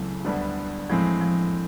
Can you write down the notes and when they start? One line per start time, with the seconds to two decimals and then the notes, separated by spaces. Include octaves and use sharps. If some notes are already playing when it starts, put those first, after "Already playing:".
Already playing: C#2 C#3 E3 F#3 A3 C4
0.25 D2 D3 G3 B3 D4
0.90 A2 E3 F3 G#3 C4
1.21 F3